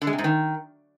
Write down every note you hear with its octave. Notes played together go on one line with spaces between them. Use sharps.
D3
G#3
C3
G#2
D#3